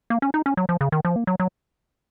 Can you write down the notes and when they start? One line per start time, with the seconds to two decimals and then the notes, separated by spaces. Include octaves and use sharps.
0.10 A#3
0.22 C#4
0.34 D#4
0.46 C#4
0.57 F#3
0.69 F3
0.81 C#3
0.92 D#3
1.05 F3
1.16 A#3
1.27 F#3
1.40 F#3